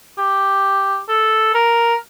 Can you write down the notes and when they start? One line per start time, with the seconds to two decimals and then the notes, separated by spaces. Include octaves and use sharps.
0.18 G4
1.09 A4
1.54 A#4